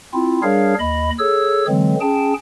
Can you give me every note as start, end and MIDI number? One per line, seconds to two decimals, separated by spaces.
0.13 0.41 60
0.13 0.41 64
0.13 0.41 65
0.43 0.74 55
0.43 0.74 62
0.43 0.74 68
0.43 0.74 70
0.43 0.74 73
0.43 0.74 77
0.79 1.10 39
0.79 1.10 75
0.79 1.10 83
1.19 1.65 68
1.19 1.65 69
1.19 1.65 73
1.19 1.65 88
1.68 1.95 50
1.68 1.95 52
1.68 1.95 54
1.68 1.95 56
1.68 1.95 60
2.01 2.34 61
2.01 2.34 68
2.01 2.34 79
2.01 2.34 81